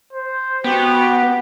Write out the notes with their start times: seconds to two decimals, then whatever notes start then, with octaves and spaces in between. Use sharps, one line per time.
0.13 C5
0.64 B3 F#4 G4